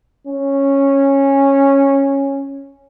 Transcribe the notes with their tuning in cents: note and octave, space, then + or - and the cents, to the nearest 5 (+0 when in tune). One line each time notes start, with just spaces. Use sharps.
C#4 -10